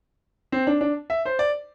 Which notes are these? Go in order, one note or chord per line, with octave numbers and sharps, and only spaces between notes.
C4
D4
D4
E5
C5
D5